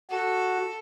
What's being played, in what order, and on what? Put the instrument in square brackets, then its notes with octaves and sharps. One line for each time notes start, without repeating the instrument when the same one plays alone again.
[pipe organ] F#4 [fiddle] A4